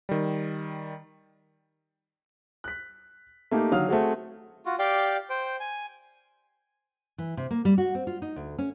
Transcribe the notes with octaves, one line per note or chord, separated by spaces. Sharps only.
D#3 G3
F#6 B6
A3 A#3 D#4 G4
D3 D#3 F#3 F5 D#6 F6
A3 C4 F#4 G#4
F4 F#4
G4 D5 F5 G5
C5 G5
G#5
E3
C3
A#3
G3
F#4
C4
F4
D#4
D2
C#4